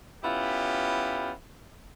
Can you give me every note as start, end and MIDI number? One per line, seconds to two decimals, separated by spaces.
0.23 1.31 59
0.23 1.31 61
0.23 1.31 64
0.23 1.31 65
0.23 1.31 67